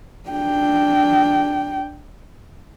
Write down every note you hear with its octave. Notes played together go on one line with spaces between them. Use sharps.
D4 G5